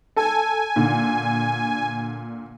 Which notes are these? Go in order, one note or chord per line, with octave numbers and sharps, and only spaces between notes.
A4 G#5 A5
A#2 D3